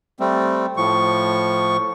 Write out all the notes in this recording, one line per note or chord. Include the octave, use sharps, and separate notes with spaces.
G3 A3 C4
A2 F3 C#6